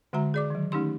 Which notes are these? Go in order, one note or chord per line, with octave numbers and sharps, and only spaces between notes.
D3 G#3 F#4 E5 A#5
G#4 D5 D6
D#3 F#3
D#3 A3 C#4 D#4 G4 C6